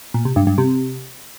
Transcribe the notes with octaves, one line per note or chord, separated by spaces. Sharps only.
A#2
C3
G2
G2
C3